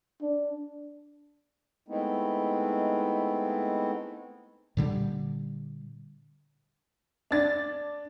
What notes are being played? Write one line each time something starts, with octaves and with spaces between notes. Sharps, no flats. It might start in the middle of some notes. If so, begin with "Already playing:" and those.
D4
G#3 A3 B3 C4 D#4 E4
A#2 D3 G3
D4 A6